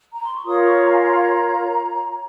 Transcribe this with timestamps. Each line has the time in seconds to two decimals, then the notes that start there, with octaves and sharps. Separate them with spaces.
0.12 A#5
0.23 C6
0.34 C#6
0.44 F4 A#4 C#5 D#6
0.64 C#6
0.84 A#5
0.91 G#5
0.99 A#5